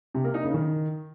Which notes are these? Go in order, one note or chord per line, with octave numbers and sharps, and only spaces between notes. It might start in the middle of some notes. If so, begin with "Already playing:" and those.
C3
A#3
D#4
C#3
D#3